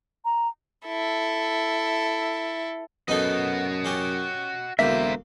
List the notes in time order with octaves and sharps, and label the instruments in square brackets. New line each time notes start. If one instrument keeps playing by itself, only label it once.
[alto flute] A#5
[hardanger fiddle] E4 A4
[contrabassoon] F#2 [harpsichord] B3 D#4 A4 [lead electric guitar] F#4 D#5
[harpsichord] C#4 G4
[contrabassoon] E1 [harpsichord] D2 A#3 [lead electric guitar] A#4 C5 [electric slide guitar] E5